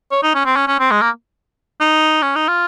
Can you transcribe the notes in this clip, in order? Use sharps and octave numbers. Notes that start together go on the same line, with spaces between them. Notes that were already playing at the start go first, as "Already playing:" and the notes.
C#5
D#4
C#4
C4
C#4
C#4
C4
G#3
A#3
D#4
C#4
D#4
F4